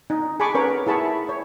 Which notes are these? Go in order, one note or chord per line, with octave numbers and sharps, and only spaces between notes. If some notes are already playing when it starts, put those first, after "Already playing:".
D#4 D#5
G#4 G#5 A5 B5 C#6 D6
C#4 A#4 B4 C#5
E4 G#4 A5 B5 C#6
C#5